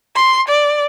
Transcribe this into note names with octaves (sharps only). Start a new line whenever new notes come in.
C6
D5